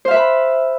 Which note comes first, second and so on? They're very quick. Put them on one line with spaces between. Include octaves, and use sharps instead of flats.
C5 F5 E5 B4 B5